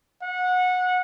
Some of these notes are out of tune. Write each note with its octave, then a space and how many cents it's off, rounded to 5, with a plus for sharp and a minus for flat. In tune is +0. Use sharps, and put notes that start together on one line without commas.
F#5 -20